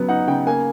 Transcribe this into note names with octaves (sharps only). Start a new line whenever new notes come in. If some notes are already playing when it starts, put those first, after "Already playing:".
Already playing: C#3 F#3 B3
D#4 F#5
C#3 G5
A#3 G#5